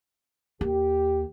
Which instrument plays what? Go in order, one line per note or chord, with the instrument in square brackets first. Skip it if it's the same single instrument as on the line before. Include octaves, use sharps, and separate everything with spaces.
[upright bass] D#2 [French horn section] G4